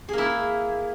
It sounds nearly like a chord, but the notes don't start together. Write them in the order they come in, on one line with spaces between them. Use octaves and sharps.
G#4 A#3 E4